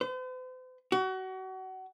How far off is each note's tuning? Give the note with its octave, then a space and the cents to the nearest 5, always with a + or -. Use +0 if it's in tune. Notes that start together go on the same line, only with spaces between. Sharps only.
C5 -45
F#4 +30